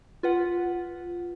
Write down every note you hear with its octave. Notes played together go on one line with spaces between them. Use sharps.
F4 B4 F#5